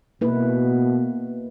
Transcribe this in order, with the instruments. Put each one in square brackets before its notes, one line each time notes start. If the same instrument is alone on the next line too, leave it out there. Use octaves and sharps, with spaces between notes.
[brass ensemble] B2 [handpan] A#3 E4 B4